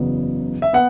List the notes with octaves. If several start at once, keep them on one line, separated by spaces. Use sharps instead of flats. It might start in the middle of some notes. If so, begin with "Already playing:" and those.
Already playing: F#1 E2 C#3 F#3 B3
E5
B3 F#5